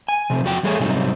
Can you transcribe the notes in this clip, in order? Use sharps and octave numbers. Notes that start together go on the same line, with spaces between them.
G#5
C3 F3 C4
F2 F#4 G5
E2 G3 A3 G#4 C#5 G#5
G#2 C3 F#3 G3 C4 D#4